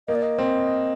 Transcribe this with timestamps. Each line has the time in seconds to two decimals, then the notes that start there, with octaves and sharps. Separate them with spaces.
0.08 A#3 D#5
0.15 D5
0.22 D#5
0.38 C4